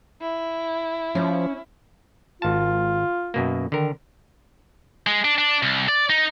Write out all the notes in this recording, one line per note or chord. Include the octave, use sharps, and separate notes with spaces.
E4
F3 C#4
G#1 F4 A5
F#2 B2 A#3
D3 D#3 A#4
G#3
D4
D4
C2
D5
D#4